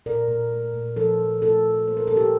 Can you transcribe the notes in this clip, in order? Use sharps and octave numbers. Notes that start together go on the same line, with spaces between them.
A#2 A#4 D5
A#2
A3
A#2
F3 A4 C5
F3
A3 F4 A4
F3
A#3 C5
A#4
A#3 A4
G4 A#4